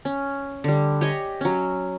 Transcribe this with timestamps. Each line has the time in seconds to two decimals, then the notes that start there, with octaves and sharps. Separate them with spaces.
0.05 C#4
0.64 D3 G3
1.01 G4 C#5 D#5 G#5
1.41 F#3 C#4